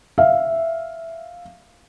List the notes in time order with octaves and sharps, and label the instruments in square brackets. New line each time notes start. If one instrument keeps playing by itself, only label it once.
[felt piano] E5 F5